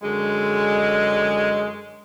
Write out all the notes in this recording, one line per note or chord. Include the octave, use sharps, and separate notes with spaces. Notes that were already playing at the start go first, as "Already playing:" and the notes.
F#2 D3 G#3